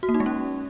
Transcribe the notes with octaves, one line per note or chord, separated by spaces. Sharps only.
F#4
A#3
D#4
G#3
C#4